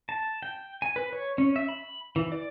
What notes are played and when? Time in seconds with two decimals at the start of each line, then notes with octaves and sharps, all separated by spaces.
0.09 A5
0.43 G5
0.82 G#5
0.96 B4
1.13 C#5
1.38 C#4
1.56 E5
1.69 B5
2.16 E3
2.32 D5